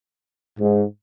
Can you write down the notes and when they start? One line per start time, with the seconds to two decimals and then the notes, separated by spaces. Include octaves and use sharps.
0.59 G#2